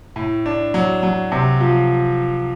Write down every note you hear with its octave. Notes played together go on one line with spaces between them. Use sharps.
A2
D4
F#3
F#3
C3
F3